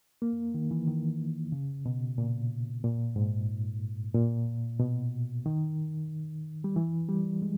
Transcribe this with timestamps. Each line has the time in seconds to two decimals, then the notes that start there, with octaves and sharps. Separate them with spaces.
0.22 A#3
0.55 D#3
0.71 E3
0.88 D#3
1.52 C#3
1.86 B2
2.18 A#2
2.84 A#2
3.16 G#2
4.14 A#2
4.80 B2
5.46 D#3
6.64 G3
6.76 E3
7.09 G3
7.42 G#3